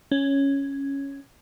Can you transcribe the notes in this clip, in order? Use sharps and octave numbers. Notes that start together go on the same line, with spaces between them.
C#4